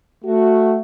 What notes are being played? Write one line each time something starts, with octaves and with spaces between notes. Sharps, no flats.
A3 F#4